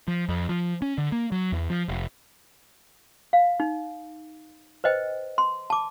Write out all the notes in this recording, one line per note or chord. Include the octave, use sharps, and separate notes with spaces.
F3
F2
F3
C#4
D3
A#3
F#3
E2
F3
F1
F5
D#4
B4 C5 D#5 G5
C6
A5 D6